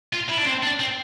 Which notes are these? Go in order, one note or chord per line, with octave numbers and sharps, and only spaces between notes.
F4
E4
D4
C4
D4
C4